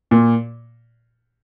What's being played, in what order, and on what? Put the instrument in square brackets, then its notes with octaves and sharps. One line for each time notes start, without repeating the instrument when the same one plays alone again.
[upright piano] A#2